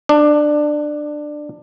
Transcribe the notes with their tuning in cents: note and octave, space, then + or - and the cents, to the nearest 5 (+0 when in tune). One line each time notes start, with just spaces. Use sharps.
D4 +15